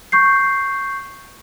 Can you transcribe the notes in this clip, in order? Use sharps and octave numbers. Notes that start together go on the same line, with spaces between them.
C#6 G6 C7